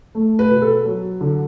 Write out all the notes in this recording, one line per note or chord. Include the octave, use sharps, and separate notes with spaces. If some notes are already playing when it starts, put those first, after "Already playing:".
A3
B4
B2
A4
F#3
D3